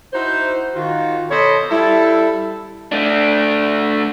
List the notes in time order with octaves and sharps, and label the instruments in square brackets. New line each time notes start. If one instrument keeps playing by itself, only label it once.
[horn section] D#4 E4 F#4 C5
D#3 F4 F#4
B2 A4 C5 C#5 D#5 B5
G3 E4 A4
[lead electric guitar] A3 D4